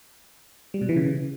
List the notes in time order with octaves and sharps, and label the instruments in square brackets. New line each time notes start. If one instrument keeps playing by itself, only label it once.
[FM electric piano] G3
B2
E3
C#3